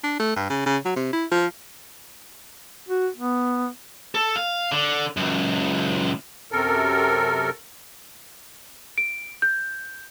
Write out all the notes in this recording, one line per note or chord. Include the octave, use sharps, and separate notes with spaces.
D4
A3
G2
C#3
C#3
F#3
C3
E4
F3
F#4
B3
A4
F5
D3
C#2 F#2
F#2 C3 A4 A#4
D7
G6